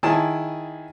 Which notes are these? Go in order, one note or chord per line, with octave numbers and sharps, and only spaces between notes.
D#3 E4 G#4 G#5 A5